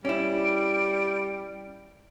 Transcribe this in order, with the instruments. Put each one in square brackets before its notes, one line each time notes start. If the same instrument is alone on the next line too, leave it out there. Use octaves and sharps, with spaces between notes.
[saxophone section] G3 [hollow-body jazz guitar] C#4 E4 [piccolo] D7